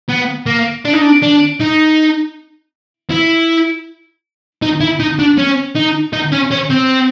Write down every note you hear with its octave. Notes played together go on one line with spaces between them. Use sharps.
B3
A#3
D4
D#4
D4
D4
D#4
E4
D#4
E4
D#4
D4
C#4
D#4
D#4
C#4
C#4
C4